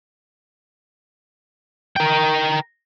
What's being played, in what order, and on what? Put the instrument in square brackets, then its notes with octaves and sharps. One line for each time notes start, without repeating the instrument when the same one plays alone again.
[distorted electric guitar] A#4 G5